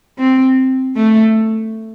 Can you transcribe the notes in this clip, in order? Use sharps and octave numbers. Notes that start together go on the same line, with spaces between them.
C4
A3